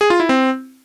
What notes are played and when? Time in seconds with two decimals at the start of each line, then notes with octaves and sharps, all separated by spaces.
0.01 G#4
0.10 F4
0.20 E4
0.29 C4